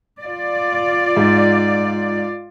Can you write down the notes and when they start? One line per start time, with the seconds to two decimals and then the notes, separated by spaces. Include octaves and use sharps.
0.22 F4 D5
1.17 G#2